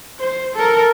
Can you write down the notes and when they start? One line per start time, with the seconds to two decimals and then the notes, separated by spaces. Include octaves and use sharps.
0.20 C5
0.55 A4 A#4